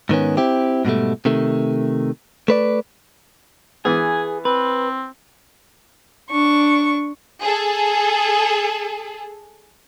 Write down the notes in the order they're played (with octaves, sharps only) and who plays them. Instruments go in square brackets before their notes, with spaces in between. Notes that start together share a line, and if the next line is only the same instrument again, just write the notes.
[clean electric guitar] G#2 D#3 B3 C#4
C4 E4 G4
G#2 B2 G3 A3
C3 D#3 A3
A3 B4 D5
[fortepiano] E3 B3 [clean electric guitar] G#4 [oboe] G#5
[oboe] C4 [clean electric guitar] B4
[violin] D4 C#6
[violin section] G#4 A4